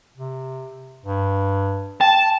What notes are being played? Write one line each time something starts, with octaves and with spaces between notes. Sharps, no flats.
C3
G2
G5 A5